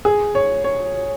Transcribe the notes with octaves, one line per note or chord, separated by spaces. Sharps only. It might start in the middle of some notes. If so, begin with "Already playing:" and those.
G#4
C#5
C#5